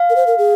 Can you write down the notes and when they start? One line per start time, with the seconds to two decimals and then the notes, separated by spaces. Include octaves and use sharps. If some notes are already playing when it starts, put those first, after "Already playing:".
Already playing: F5
0.10 A#4
0.16 C5
0.27 A#4
0.38 G#4